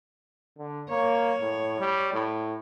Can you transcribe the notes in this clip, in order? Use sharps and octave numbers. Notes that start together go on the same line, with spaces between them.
D3
A#3 C#5
A2
G3
A2